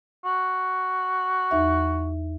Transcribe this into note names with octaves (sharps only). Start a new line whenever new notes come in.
F#4
E2 D#4 E5